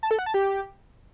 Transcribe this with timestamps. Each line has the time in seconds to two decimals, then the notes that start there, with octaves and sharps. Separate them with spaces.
0.03 A5
0.11 A4
0.19 F#5
0.26 A5
0.34 G4